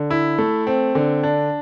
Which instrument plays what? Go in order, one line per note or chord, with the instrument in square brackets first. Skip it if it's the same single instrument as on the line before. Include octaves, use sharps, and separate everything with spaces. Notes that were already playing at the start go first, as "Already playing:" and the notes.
Already playing: [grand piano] D3
E4
A3
C4
D3
D4